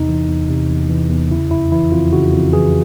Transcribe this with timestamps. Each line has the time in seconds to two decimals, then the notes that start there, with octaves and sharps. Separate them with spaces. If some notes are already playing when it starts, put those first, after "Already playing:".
Already playing: E2 C3 D#4
0.08 E3
0.29 E2
0.49 C3
0.70 E2
0.90 E3
1.10 E2
1.31 C#3 E4
1.51 F2 E4
1.72 E3 E4
1.92 F2 F4
2.13 C#3 F#4
2.33 F2
2.53 E3 G#4